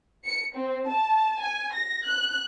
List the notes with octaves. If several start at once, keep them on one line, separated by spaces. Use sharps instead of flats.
C#7
C4
A5
G#5
A#6
F#6